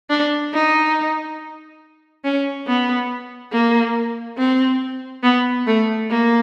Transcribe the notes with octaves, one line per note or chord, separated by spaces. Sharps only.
D4
D#4
C#4
B3
A#3
C4
B3
A3
A#3